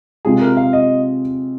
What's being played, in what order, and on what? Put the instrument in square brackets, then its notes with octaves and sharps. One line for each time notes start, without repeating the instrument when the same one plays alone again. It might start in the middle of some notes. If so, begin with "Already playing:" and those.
[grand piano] C3 G#3 F4 [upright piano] G#4
[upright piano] A#4
F5
D#5